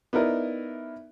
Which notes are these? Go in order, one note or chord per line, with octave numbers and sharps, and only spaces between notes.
B3 D#4 E4 A#4 D5